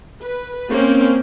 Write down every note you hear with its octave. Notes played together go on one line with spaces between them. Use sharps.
B4
A#3 C4 C#4